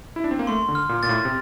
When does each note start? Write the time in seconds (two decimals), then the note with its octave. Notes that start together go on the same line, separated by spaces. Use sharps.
0.16 E4
0.24 D4
0.31 C4
0.39 A#3
0.47 A3 C6
0.68 D3
0.75 F6
0.89 A#2
1.03 A#2 A6
1.09 A2
1.25 C3